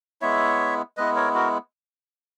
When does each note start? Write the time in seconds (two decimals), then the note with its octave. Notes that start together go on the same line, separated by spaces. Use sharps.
0.21 G#3 B3 E4 C#5 E5
0.97 G#3 B3 E4 B4 D#5
1.16 A#4 C#5
1.35 F#4 A#4